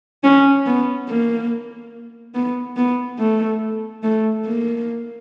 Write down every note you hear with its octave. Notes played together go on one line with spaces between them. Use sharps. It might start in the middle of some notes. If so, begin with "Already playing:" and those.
C#4
B3
A#3
B3
B3
A3
A3
A#3